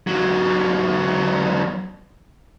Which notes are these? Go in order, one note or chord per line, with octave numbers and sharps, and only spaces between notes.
E2 F#3